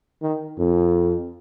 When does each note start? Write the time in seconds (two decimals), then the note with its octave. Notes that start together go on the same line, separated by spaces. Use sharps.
0.22 D#3
0.59 F2